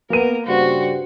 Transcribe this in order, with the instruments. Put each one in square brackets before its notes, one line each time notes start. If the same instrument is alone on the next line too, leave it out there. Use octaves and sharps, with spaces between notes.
[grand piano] A#3 D#7 [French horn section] B3 [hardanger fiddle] A#4
[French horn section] G2 C#3 G3 [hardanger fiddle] F#4 C5